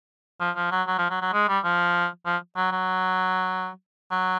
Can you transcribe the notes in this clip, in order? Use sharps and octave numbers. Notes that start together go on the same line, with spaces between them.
F3
F3
F#3
F#3
F3
F#3
F#3
G#3
G3
F3
F3
F#3
F#3
F#3